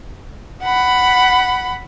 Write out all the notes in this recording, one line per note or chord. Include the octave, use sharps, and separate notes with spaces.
F#5 B5